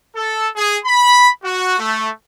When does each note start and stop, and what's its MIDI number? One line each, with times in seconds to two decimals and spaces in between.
0.16 0.47 69
0.56 0.77 68
0.85 1.30 83
1.44 1.77 66
1.79 2.09 57